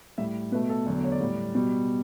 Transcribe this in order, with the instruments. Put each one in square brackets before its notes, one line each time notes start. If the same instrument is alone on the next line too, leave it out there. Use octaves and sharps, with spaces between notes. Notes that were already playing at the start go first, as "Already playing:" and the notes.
[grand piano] A2 G3 E5
B2 A3 B4
A4
E2 D3 F#3 A4
C#5
D5
A2 G3
B2 G3